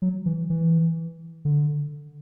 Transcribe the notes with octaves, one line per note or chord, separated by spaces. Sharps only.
F#3
E3
E3
D3